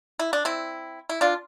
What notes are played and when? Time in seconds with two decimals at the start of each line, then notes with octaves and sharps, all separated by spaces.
0.19 E4
0.33 D4
0.45 C4 E4
1.09 E4
1.21 D4 F4